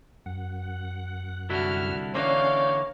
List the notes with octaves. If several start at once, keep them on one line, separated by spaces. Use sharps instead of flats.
F#2 F#5
C2 D3 E4 F#4 F6
D3 E3 A#3 C#4 C#5 D5 F5 G6